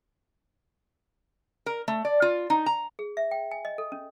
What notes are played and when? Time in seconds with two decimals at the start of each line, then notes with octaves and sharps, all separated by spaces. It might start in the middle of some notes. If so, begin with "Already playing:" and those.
1.66 A#4
1.88 A3
2.05 D5
2.22 F4
2.50 D#4
2.66 A#5
2.99 G#4
3.17 E5
3.31 G5
3.51 G#5
3.65 D#5
3.78 A4
3.92 C#4